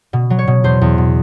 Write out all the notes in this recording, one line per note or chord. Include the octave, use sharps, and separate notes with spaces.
B2
F#3
C#5
B2
E2 C5
E2
B2